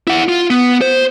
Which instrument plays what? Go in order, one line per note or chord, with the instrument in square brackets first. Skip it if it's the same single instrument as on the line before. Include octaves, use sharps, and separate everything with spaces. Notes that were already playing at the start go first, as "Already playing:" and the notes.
[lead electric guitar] E4 F#5
F4
B3
C5